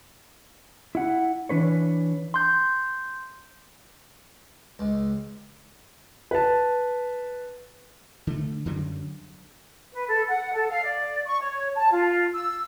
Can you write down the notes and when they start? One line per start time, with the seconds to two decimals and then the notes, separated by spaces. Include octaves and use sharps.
0.95 E4 F#5
1.49 E3 D4 B4 C#5
2.34 C6 G6
4.79 C#2
6.31 B4 A5
8.27 D3 A3
8.65 F#2 D3 F#3 G3
9.93 B4
10.08 A4
10.29 F#5
10.54 A4
10.69 F5
10.83 D5
11.26 C#6
11.41 C#5
11.75 A5
11.91 F4
12.33 E6